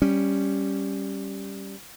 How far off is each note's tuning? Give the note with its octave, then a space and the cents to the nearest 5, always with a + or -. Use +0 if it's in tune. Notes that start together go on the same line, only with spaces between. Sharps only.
G3 +0 C#4 +0